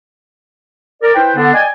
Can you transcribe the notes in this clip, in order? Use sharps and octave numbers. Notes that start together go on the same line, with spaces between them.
A#4 D5
E4 B4 C5 G5
D3 B3 D4
D5 D#5 G5 G#5